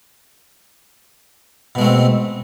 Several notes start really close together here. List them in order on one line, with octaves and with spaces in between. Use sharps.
B2 G#3 A3 C4